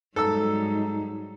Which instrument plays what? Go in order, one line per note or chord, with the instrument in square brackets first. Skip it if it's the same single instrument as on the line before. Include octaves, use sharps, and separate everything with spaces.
[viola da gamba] G#2 F#3 G3 [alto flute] D#4 [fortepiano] A4 E6 [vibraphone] A#5